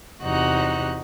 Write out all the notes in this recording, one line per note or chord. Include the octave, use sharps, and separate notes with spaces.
E2 C3 D#4 F#4 F#6